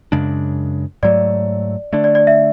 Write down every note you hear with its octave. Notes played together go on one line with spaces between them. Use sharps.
F#2 C#3 G#3 D4
G#2 F#3 A3 D5
D3 A3 D4 D5
D5
D5
E5